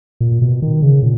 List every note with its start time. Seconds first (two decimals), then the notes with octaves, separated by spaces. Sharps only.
0.21 A#2
0.42 B2
0.62 D#3
0.82 C#3
1.03 A#2